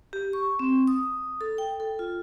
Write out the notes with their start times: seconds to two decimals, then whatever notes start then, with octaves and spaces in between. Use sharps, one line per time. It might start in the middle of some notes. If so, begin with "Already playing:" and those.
0.13 G4
0.33 C#6
0.59 C4
0.87 D#6
1.41 A4
1.58 G5
1.80 A4
1.99 F4